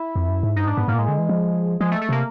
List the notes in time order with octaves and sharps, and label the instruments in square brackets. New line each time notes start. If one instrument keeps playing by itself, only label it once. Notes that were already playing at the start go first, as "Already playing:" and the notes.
Already playing: [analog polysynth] E4
[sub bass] F2
F#2
G#2
[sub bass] G2 [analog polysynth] D#4
[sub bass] G#2 [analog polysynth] D4
[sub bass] G#2 [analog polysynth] B3
[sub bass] G#2 [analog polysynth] A#3
[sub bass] A#2
[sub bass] A2 [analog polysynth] G#3
[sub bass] D3
E3
F3
[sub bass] F3 [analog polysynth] G#3
[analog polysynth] A3
A3
[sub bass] C3 [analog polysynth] A#3